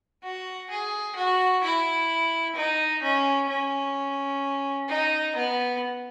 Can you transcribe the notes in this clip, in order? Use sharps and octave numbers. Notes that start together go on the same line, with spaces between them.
F#4
G#4
F#4
E4
D#4
C#4
C#4
D#4
B3